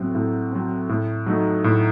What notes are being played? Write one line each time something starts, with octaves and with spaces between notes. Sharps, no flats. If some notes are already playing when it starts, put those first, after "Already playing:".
Already playing: A2 F#3 C4
A2
F#3 C4
A2
F#3 A3 D#4
A2